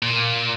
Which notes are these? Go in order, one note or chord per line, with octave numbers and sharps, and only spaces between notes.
A#2